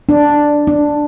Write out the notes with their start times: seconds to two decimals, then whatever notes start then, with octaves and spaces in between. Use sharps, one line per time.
0.09 D4
0.67 D4